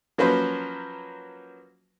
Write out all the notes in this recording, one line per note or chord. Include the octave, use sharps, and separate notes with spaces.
F3 F#3 A#3 C#4 B4 C5